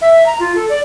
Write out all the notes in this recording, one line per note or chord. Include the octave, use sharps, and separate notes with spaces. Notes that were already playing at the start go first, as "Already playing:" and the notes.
E5
A#5
F4
A4
D5